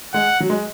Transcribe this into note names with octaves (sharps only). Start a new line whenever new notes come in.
G#3 F#5
F#3
G#3